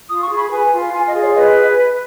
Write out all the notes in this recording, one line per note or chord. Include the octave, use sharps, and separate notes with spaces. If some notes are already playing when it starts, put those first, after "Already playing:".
F4 D#6
C#6
G#4
B5
B4 G#5
F4
F4 G#5
D#5
G#4
C#5
B4 D#5